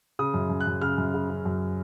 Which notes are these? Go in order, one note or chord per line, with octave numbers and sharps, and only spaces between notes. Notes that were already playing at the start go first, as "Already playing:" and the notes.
C#3 D#6
F#2
F#2
F#6
F#2
C#3 F6
F#2
C#3
C#3
F#2